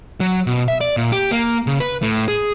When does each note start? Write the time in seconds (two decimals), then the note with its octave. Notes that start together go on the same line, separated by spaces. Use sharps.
0.20 F#3
0.47 B2
0.68 E5
0.81 D5
0.97 A#2
1.12 G4
1.31 A#3
1.67 C#3
1.80 B4
2.02 A2
2.28 G#4